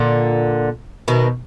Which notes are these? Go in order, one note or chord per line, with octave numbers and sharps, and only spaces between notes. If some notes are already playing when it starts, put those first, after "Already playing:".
Already playing: A#2 D3
B2 D#3